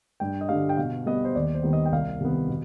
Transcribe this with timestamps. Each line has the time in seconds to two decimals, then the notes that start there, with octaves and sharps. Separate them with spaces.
0.20 G2 G5
0.41 D#5
0.49 D3 G3 F5
0.69 G5
0.77 B2 F5
1.06 G3 B3 D#5
1.25 C5
1.35 D#2 D5
1.55 C5
1.63 D#3 G3 B3
1.73 D#5
1.86 G5
1.92 C2 F5
2.21 C3 D#3 B3
2.49 B2